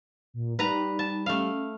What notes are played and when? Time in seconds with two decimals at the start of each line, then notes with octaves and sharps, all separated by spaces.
0.34 A#2
0.59 G3 D#4 B4 A#5
0.99 A5
1.26 A3 C#4 F5